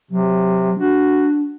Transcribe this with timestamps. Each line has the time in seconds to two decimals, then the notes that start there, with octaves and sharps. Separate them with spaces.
0.11 C3 F#3
0.79 D4 F#4